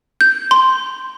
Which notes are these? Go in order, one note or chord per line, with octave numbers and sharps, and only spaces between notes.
G6
C6